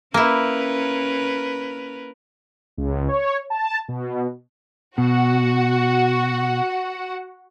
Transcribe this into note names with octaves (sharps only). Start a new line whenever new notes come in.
A#3 C#4 E4 A#4 B4
C#2
C#5
A5
B2
B2 F#4 F#5